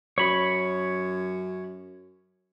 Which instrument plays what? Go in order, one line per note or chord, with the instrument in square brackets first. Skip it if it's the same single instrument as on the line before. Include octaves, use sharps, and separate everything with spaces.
[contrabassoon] F#2 [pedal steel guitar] C#5 B5